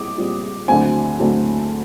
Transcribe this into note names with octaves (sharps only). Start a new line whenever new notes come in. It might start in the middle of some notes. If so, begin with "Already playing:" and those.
Already playing: A#2 G3 C4 D6 D#6
A#2 G3 C4 F4
D2 D3 F#3 A3 C4 G#5
D2 D3 F#3 A3 C4